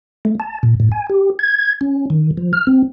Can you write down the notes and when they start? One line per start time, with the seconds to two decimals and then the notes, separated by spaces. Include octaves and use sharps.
0.25 A3
0.40 A5
0.63 A#2
0.80 A2
0.92 G#5
1.10 G4
1.39 G#6
1.81 C#4
2.10 D#3
2.37 F3
2.53 F6
2.67 C4